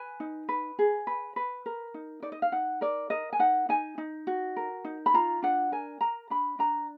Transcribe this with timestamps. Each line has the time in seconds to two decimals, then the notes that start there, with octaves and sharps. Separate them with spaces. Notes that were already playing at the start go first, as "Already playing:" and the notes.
Already playing: B4 G#5
0.20 D#4
0.49 B4
0.79 G#4
1.07 B4
1.36 B4
1.66 A#4
1.94 D#4
2.22 D#4 D5
2.32 D#5
2.42 F5
2.52 D#4 F#5
2.81 A#4 D5
3.10 A#4 D#5
3.33 G#5
3.39 D#4 F#5
3.69 D#4 G#5
3.98 D#4
4.27 F#4
4.57 A#4
4.85 D#4
5.06 B5
5.14 F4 A#5
5.42 D4 F#5
5.72 A#4 G#5
6.01 A#4 A#5
6.30 D4 B5
6.59 D4 A#5